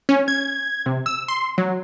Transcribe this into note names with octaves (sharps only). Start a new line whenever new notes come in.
C#4
G#6
C3
E6
C6
F#3